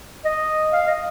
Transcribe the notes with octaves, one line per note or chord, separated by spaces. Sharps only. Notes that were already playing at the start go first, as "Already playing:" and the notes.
D#5
F5
D#5